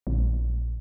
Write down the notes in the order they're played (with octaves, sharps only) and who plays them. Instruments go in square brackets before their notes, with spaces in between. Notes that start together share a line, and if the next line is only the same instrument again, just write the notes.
[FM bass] A#1